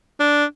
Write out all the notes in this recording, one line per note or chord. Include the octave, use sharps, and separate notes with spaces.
D4